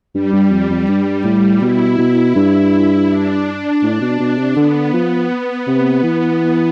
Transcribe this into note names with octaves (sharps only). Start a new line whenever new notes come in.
G2 G3
G2
F2
F2
G2
A2
B2 E4
B2
G2
D4
A2
B2
B2
C3
D3 B3
F3
C3
E3